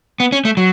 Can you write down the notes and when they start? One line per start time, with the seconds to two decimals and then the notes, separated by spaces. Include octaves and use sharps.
0.20 B3
0.32 C#4
0.45 A3
0.57 F#3